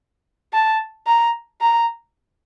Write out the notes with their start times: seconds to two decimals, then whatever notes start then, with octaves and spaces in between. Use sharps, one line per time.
0.53 A5
1.07 A#5
1.61 A#5